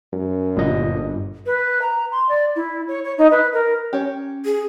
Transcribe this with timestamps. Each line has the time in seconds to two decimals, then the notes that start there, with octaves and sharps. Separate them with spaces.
0.13 F#2
0.57 G1 A#2 D#5
1.46 B4
1.82 A#5
2.12 C6
2.29 D5
2.55 E4
2.88 C#5
3.04 C#5
3.18 D#4
3.31 B4
3.53 A#4
3.93 C#4 G4 C#5
4.45 G#4